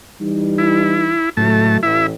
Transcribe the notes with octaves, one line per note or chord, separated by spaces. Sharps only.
E3 G3 D#4
E4
C#2 A2 F#3 A3 A5
A1 E4 E5